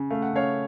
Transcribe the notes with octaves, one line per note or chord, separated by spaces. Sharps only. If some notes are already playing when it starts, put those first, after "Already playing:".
Already playing: C#3
A3 F5
F#5
C#3 C#5 F5